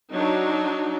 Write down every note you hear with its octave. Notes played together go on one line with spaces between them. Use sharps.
F#3 D4 D#4